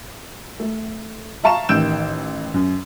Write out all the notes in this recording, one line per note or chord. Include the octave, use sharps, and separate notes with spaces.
A3
E5 F5 A5 A#5 C#6 E7
A1 D#3 E6 G6 D7 E7
F#2